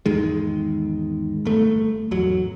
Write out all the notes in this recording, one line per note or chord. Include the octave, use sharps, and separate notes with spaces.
G#1 E2 D#3 G#3
G1 A3
G#1 E2 F#3